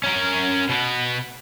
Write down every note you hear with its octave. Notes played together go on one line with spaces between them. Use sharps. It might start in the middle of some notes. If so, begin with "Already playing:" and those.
C#4 A#4
B2 B3